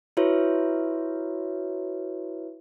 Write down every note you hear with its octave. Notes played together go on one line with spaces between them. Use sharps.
E4 F#4 B4 C#5 E5